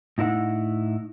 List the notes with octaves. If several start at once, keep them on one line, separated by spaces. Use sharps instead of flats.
A2 D#4 E4 B4 F#5